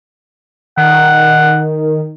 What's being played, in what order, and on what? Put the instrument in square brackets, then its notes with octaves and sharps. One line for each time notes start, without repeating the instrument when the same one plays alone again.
[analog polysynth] D#3 [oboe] F#5